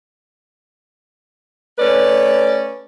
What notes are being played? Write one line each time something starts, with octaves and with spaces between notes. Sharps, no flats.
A3 C#4 B4 D5